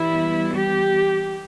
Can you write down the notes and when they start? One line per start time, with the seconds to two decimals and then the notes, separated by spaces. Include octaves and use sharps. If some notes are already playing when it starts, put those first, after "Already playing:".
Already playing: E3 G3 B3 E4
0.55 G4